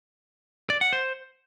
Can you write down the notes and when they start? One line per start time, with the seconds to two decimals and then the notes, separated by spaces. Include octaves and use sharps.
0.70 D5
0.81 F#5
0.93 C5